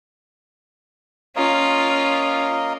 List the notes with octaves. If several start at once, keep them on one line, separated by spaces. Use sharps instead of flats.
A#3 C#4 F4 A#4 D#5